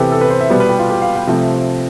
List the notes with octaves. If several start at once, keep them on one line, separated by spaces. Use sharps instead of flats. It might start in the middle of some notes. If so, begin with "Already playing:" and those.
Already playing: C3 E3 B3 G4 A4 B4
A4
B4
C5
E5
B2 G3 B3 D5
B4
G4
F4
G4
F5
G5
C3 F3 A3